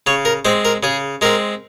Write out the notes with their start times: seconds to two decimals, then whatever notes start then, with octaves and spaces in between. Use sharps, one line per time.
0.07 C#3 C#5
0.25 A#4
0.45 G#3 C4 C5
0.65 A#4
0.83 C#3 G#4
1.21 G#3 C4 A#4